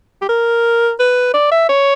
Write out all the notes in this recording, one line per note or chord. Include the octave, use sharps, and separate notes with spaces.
G4
A#4
B4
D5
E5
C#5